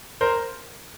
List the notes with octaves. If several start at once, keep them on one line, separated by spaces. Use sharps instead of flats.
A#4 C5